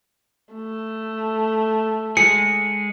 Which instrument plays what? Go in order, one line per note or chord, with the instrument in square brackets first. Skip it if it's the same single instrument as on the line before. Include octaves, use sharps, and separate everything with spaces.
[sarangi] A3
[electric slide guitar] G#3 G#4 [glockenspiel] C#7